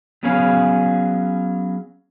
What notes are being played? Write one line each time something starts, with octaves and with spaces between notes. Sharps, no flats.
F#3 B3 C#4 G#4 C#5 F5